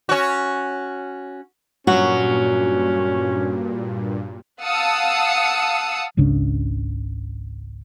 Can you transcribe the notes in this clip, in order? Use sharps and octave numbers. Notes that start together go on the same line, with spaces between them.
C#4 F#4
G2 A#2 F#3 C#4 F#4
F5 F#5 A5 D#6 E6 C#7
G#1 C#2 C#3 D4